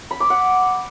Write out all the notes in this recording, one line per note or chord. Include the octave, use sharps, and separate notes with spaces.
B5
D6
F#5